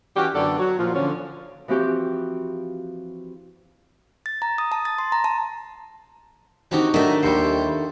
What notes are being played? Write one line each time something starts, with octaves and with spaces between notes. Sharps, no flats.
E3 C#4 F#4 G4
F#2 D3 B3 F#4 A4 D5
F#3 F#4
A#2 F3 F4
D3 F3 C#4
E3 F3 C4 F#4 G4 G5
A6
A#5
D#6
A5
A6
C6
A#5
A5
D#3 C4 D4 D#4 F#4 G4
D#3 F#3 A3 D4 D#4 E5
D#2 A#2 G3 A4 C5